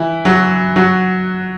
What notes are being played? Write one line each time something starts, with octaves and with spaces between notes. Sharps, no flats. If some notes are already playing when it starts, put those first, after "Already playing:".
Already playing: E3 E4
F#3 F#4
F#3 F#4